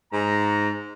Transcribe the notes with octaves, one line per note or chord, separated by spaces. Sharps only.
G#2 A#5